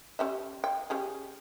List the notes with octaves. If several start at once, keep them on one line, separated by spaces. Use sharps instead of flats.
C#4 G4 E5
G5
C#4 G4 G#4